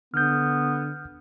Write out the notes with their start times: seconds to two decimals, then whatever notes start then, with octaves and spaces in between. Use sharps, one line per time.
0.14 D3 B3 F6 G6